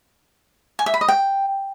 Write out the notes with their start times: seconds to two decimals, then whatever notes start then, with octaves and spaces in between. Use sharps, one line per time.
0.79 G#5
0.86 E5
0.94 B5
1.01 D#5
1.08 G5